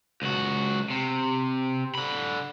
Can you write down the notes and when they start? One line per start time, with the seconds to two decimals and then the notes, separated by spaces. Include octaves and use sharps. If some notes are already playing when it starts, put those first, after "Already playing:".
0.22 C#2 F#4
0.90 C3
1.95 D3 B5